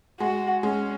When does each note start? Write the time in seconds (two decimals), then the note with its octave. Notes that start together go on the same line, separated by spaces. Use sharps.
0.20 G#3 F#4
0.63 G#3 C#4